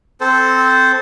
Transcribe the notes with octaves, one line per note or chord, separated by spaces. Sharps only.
C4 A4 C5